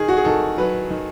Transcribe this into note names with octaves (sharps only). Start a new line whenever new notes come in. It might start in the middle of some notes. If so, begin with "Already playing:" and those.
Already playing: D#3 G#4
F#4
G#4
D#3 A4
F#3 B4
D#3